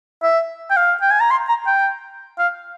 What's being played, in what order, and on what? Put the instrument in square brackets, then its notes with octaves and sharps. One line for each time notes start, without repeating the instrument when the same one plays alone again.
[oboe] E5
G5
F5
G5
G#5
A#5
C6
A#5
G5
F5